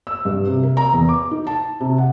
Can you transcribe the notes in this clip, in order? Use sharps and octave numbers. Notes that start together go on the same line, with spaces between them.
E6
G2
C3
A#4
A#5
E2
D6
D#4
A5
C3
F#5